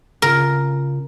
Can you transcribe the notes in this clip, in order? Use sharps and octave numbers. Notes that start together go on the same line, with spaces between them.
C#3 F4 A#4